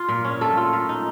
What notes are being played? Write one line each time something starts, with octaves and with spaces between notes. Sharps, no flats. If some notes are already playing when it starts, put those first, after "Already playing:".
Already playing: F4
A#2
C#4
A3 A4
F4
A#2
D#4